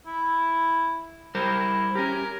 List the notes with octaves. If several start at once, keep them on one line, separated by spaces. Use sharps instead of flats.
E4
G3 E4 A#4 C5
C#4 G4 A#4